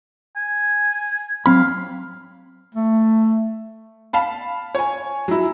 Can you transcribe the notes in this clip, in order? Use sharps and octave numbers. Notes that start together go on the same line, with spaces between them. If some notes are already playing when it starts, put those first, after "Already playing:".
G#5
F#3 C4 F5 B5
A3
F5 A5 B5
C#5 G#5
F#3 E4